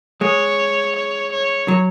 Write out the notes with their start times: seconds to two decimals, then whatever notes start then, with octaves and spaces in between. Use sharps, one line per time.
0.21 G#3 C#5
0.96 C#5
1.32 C#5
1.68 F#3